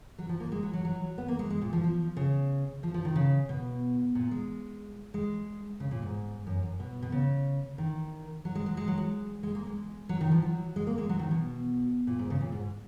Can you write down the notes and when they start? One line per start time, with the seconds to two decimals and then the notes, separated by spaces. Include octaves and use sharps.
0.18 F#3
0.29 F3
0.40 A#3
0.52 G#3
0.63 F#3
0.73 F#3
0.85 F#3
1.18 B3
1.28 A#3
1.39 G#3
1.50 G#3
1.62 A#2
1.73 F3
1.83 F3
2.16 C#3
2.83 F3
2.94 F3
3.05 D#3
3.16 C#3
3.49 B2
4.15 A#2
4.31 G#3
5.14 G#3
5.80 C#3
5.91 A#2
6.02 G#2
6.47 F#2
6.63 F#2
6.80 B2
7.02 B2
7.12 C#3
7.78 D#3
8.45 F#3
8.55 G#3
8.66 F#3
8.77 G#3
8.88 F#3
8.98 G#3
9.43 G#3
9.55 A#3
9.66 G#3
10.09 F#3
10.21 D#3
10.32 F3
10.42 F#3
10.76 G#3
10.87 A#3
10.98 G#3
11.09 F#3
11.19 D#3
11.31 B2
12.07 A#2
12.19 G#2
12.30 C#3
12.41 A#2
12.52 G#2